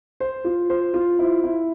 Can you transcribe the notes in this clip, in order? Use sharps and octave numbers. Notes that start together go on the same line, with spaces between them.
C5
F4
C5
F4
E4
E4